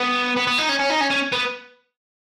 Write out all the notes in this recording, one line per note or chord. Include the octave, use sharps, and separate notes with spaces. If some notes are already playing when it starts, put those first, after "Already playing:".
Already playing: B3
B3
B3
D#4
C#4
C#4
D#4
C#4
C#4
B3